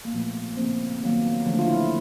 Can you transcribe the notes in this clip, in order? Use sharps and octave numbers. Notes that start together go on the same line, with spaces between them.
A#3
A#2 F3 A3 B3
C#3 F3 A#3 C4
D#3 F#3 A#3 B3
D3 F3 A3
F4
E4